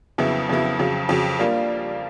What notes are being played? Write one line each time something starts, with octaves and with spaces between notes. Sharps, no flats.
F2 C#3 F#3 B3 E4
F2 C#3 F#3 B3 E4
F2 C#3 F#3
F2 C#3 F#3
G3 A#3 D4 F4